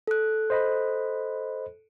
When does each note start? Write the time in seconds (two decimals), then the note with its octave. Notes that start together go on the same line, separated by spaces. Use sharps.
0.07 A4 F#6
0.50 C5 D#5 B5